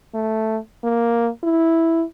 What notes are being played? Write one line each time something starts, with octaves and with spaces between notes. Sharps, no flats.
A3
A#3
E4